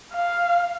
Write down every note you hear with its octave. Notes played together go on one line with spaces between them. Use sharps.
F5